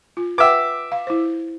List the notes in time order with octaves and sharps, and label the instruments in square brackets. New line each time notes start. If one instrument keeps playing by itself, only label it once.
[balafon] F4
[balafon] B4 F#5 G5 [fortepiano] E5 D6
[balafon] F5
E4 C5